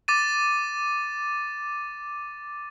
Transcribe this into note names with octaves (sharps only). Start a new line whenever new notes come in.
D6 A6 D#7